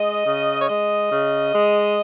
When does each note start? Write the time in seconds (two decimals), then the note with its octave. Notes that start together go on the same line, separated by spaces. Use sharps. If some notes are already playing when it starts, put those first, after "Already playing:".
Already playing: G#3 D#5
0.26 C#3
0.61 C#5
0.69 G#3 D#5
1.11 C#3
1.54 G#3